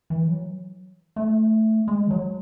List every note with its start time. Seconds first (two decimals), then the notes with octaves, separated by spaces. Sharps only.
0.10 E3
0.28 F#3
1.16 A3
1.88 G#3
2.07 E3
2.11 F#3